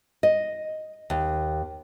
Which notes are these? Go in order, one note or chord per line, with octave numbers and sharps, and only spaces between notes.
D#5
D#2